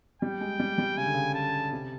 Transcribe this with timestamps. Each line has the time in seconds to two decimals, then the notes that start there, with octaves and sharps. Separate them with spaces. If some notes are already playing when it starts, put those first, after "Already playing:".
0.22 G3 G5
0.41 G#3
0.60 G3
0.78 G3
0.97 C#3 G#5
1.06 D3
1.14 C#3
1.35 A5
1.72 C3